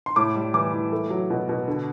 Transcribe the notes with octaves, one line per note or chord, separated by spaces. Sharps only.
C6
A2 D6
G3
E3 D6
E3
A3
F#3
B2
B2
D3